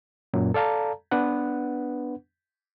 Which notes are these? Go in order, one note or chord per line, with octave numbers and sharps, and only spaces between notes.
F#2 A#2 F#3
A4 D5 F5 A5 A#5
B3 D4 B4 F#5